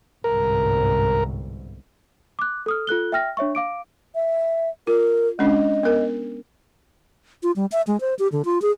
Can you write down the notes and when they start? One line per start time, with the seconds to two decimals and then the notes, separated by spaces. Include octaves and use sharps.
0.24 G1 C2 G#2 A#4
2.39 D6 F#6
2.66 A4 D#6 F6
2.87 F4 A4 F#6 G7
3.12 E5 G5 F6 A#6
3.37 D4 C#5 E5 C#6
3.55 F5 D6 D7
4.15 E5
4.87 F4 A#4
5.39 G#3 C#4 D4 D#5
5.83 B3 A#4
7.43 F4
7.56 G3
7.72 E5
7.87 G#3
8.01 C5
8.19 G4
8.32 D3
8.45 F4
8.62 G#4